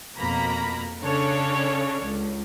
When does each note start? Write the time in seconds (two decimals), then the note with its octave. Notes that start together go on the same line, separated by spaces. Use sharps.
0.16 F2 B2 A#3 A#5 B5
1.02 C#3 C#4 D4 A4 C#5
2.04 C#2